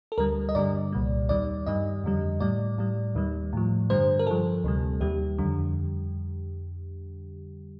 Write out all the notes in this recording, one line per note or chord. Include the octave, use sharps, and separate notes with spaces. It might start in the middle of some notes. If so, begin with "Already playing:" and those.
A4
D2 D3 G3 A#4
D#5
G2 D3 G3 D5
C2 A#2 G3
D#2 D#3 G3 D5
G2 D#3 G3 D#5
F2 D3 G3
A2 G3 D5
A2 G3
D#2 D#3 G3
A2 F3
G2 D3 G3 C5
A#4
G2 F3 A4
D2 C3 G3
D#2 D#3 G3 G4
F2 D3 G3